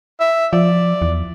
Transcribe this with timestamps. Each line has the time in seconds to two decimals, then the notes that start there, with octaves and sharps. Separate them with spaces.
0.20 E5
0.53 F3 D5
1.02 E2